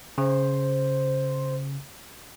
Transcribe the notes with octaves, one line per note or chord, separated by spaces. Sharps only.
C#3 C5